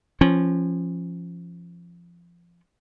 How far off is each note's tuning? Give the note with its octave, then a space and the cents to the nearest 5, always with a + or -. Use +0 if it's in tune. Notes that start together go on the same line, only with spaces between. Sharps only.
F3 -20 C#4 -25